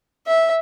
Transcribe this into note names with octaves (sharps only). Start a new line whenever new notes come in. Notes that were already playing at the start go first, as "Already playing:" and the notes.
E5